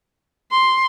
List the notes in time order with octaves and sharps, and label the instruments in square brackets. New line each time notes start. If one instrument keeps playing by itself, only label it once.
[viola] C6